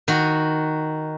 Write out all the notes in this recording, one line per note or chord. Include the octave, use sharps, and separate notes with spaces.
D#3 F#4